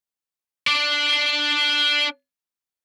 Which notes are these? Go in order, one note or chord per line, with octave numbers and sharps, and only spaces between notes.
D4 D5